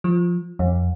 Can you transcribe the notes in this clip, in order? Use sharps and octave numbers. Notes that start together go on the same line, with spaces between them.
F3
F2